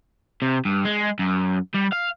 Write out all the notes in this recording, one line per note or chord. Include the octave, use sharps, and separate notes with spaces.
C3
G2
G#3
F#2
G3
F5